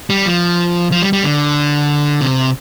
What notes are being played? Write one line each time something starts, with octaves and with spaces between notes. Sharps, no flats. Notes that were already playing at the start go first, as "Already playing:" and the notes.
G3
F3
F3
G3
G3
D3
C3